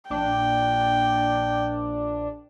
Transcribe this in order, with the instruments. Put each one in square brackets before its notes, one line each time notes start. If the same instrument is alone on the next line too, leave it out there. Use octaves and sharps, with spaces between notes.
[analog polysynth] A#1 D4 [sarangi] G5